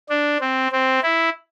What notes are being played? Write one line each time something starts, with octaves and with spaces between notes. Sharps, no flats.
D4
C4
C4
E4